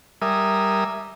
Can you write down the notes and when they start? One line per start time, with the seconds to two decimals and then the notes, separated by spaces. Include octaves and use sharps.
0.22 G3 A#4 E5 G#5 D#6